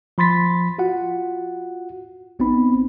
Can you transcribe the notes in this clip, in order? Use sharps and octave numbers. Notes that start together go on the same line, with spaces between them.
F3 B5 C6 A6 B6
F4 F#4 F#5
A1 B3 C4 D#4 B5